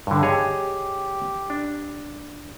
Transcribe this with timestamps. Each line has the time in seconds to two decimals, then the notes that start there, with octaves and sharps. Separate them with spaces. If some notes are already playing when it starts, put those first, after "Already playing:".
0.07 G2 D3
0.23 G4 G#4 C#5 D#5
1.50 D4